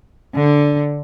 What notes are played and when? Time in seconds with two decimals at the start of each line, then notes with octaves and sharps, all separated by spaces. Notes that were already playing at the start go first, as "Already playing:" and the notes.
0.37 D3